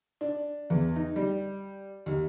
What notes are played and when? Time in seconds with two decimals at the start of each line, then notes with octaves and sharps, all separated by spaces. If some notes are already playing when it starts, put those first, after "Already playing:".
0.21 D4
0.70 E2
0.96 D#4
1.16 G3
2.06 D#2